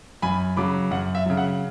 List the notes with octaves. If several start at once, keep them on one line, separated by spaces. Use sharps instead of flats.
F#2 G#5 B5
C#3 F#3 B5 D6
F#2 F#5
E5
C#3 F#3
F#5